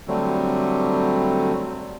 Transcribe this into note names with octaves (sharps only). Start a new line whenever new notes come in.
D3 F#3 G3 A3 C4